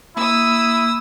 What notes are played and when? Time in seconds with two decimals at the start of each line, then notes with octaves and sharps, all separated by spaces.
0.17 A#3 E4 D#6 E6